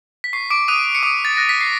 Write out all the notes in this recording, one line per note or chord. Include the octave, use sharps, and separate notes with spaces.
B6
C#6 C7
D6 D7
D#6 F#6 D#7
C#7
D6 D#6 D7
A6
F#6 A#6
B6
C7